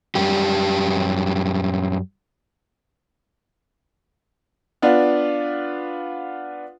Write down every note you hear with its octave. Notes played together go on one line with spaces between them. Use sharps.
F#2 G3 G4
B3 D4 F4